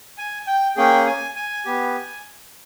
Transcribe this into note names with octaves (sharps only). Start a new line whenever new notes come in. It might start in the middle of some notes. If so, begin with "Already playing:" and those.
G#5
G5
A#3 C#4 G#4 G5
G#5
G#5
B3 G4